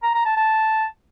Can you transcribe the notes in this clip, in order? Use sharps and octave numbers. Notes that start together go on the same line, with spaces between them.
A#5
A#5
A5
A5